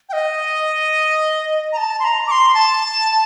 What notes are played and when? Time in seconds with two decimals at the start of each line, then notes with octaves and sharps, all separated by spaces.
0.09 G5
0.13 D#5
1.73 A#5
1.77 A5
2.00 C6
2.04 A#5
2.27 D6
2.31 C6
2.54 A5